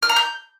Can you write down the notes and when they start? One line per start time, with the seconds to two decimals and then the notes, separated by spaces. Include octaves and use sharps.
0.03 F6
0.09 A#5
0.16 G6